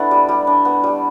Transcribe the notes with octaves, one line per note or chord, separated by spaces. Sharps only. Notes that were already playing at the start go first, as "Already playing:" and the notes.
Already playing: A3 B3 D4 E4
G3
G3
D4
B3
G3